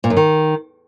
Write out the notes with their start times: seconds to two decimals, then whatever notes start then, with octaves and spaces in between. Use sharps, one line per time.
0.04 A#2
0.10 F#2
0.17 D#3